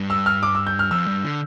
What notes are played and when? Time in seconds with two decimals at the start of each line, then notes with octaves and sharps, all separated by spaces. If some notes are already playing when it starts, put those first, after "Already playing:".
Already playing: G2
0.10 E6
0.26 F6
0.43 D6
0.55 E6
0.67 G6
0.79 F6
0.91 F2 E6
1.07 G2
1.24 D3